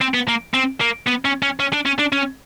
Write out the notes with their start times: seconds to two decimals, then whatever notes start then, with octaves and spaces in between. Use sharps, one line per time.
0.01 C4
0.14 B3
0.28 A#3
0.54 C4
0.80 A#3
1.07 B3
1.25 C#4
1.42 C#4
1.60 C#4
1.73 D4
1.86 C#4
1.99 D4
2.13 C#4